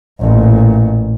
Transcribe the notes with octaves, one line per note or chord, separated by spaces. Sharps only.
A1 A#2